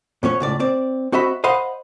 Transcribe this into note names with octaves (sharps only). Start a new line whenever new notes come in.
F2 B3 C#4 C#5
C#2 A2 D5
C4 D5
C4 F#4 D#5 E5 B5
C5 D#5 F5 F#5 B5 C6